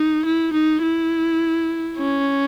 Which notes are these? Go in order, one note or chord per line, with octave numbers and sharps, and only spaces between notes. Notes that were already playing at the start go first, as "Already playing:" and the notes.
Already playing: D#4
E4
D#4
E4
C#4